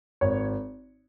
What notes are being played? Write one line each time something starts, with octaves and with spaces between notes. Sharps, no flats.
G#1 C#5